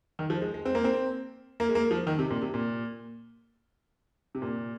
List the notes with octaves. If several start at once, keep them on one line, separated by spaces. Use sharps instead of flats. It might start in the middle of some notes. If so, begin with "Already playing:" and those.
D#3
F3
G#3
G#3
C4
A#3
C4
A#3
G#3
A#3
F3
D#3
C3
A#2
C3
A#2
C3
A#2